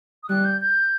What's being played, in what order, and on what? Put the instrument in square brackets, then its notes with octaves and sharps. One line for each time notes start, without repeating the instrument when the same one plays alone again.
[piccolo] D#6
[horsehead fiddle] G3 [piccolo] F#6
[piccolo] G6
G6